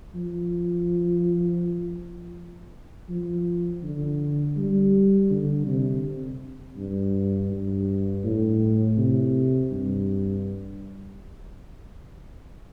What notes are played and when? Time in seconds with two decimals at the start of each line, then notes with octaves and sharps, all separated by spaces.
0.15 F3
3.09 F3
3.83 D3
4.57 G3
5.31 D3
5.66 C3
6.77 G2
7.50 G2
8.24 A2
8.98 C3
9.71 G2